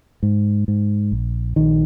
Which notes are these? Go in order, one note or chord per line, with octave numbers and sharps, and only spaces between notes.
G#2
G#2
A#1
A#1 D#3